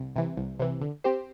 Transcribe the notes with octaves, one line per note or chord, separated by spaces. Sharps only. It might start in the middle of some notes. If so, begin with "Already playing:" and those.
Already playing: C2
C3 E3
C2
C3 E3
D3
C4 G4 C5